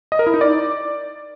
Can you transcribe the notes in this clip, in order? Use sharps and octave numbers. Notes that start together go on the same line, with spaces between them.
D#5
A#4
E4
D#4
D5